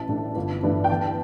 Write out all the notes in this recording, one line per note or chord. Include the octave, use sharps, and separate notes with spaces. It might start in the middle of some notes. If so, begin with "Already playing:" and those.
Already playing: A1 A5
A2 A3 D4
G1
G2 E3 A3 D4
G5
E2 A5